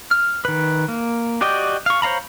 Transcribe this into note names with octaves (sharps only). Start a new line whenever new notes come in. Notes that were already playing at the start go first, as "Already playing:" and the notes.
F6
D#3 B4
A#3
F#4 G4 D5 D#5 G5
F5 C#6
C5 C#5 F5 A#5 B5